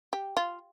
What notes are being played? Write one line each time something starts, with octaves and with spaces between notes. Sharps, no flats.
G4
F4